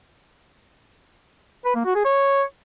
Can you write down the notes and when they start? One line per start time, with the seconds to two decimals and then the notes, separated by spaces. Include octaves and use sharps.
1.65 B4
1.75 A#3
1.85 F#4
1.95 G#4
2.05 C#5